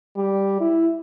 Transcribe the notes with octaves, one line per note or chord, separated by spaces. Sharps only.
G3
E4